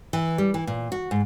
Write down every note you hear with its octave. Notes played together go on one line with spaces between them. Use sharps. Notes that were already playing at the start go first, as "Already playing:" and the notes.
E3
G3
E3
A#2
F#4
G#2